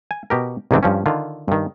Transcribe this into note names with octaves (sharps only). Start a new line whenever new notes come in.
G#5
B2 G4 A#4
C2 G#2 D#3 E3 C4 D4
G2 F3 C#4
D3 D#3 F4
G2 D#3